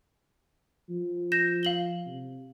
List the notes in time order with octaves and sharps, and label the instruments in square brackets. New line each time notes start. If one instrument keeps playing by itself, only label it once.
[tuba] F3
[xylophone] G6 A#6 E7
F5 F#7 G7
[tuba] C3